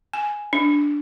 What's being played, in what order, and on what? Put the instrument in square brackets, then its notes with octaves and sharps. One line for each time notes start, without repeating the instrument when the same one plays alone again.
[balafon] G#5
D4